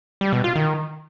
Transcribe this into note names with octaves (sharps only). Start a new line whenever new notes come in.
G3
B2
F4
D#3